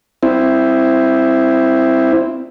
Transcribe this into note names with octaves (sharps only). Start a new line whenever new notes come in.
C4 E4